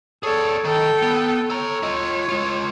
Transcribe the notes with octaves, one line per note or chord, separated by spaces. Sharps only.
G#4 A4 C#5 D5
D#3 A4 G5
B3
A4 C#5 A#5
F4 D#5
G#3 F4